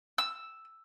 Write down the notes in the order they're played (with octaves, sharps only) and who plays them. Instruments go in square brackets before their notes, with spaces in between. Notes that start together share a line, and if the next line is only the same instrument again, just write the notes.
[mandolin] E6